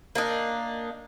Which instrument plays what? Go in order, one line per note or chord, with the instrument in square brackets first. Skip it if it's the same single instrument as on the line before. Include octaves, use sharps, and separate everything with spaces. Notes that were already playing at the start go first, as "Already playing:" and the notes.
[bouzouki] A#3 D4 D#4